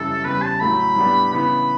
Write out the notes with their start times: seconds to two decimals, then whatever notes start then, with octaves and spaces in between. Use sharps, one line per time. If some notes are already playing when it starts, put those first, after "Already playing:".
Already playing: F#2 C#3 E3 G3 A4
0.24 E2 C#3 G3 B4
0.42 A5
0.60 A2 F#3 A3 B5
0.96 A2 G3 B3 D4
1.32 C#3 E3 B3 B5